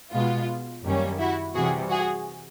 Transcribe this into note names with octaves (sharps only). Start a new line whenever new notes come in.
B2 G#3 B3 F4
F#2 D#3 G3 A#3 C#4
E4 F#4
C3 E3 G3 F#4 G#4
F#4 G#4